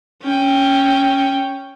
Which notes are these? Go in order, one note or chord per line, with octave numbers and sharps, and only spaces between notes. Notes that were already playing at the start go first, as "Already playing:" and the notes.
C#4 G5